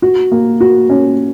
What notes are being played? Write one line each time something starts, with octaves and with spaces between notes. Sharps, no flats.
F#4
A#3
F#4
C#4